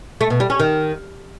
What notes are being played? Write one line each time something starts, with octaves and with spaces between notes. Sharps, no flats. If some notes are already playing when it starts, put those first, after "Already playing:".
A3
B2
G3
C#4
D#3